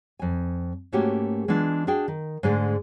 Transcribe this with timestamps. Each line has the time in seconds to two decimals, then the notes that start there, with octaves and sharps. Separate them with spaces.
0.19 F2 G#5
0.92 G#2 A3 A#3 C#4 F#4 G4
1.48 E3 G#3 B3 D4 F4
1.87 D4 F#4 G#4 G5
2.08 D#3
2.43 G#2 D3 G#3 A3